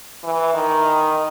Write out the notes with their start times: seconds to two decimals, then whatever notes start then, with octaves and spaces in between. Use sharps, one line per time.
0.24 E3
0.54 D#3